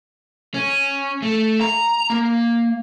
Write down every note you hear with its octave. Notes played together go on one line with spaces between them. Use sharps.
C#4
A3
A#5
A#3